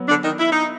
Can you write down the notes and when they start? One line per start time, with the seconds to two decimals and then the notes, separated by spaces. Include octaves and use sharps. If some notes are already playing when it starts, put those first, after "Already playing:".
Already playing: F#3 B3
0.08 D3 D4
0.24 D#3 D#4
0.39 E4
0.52 D#4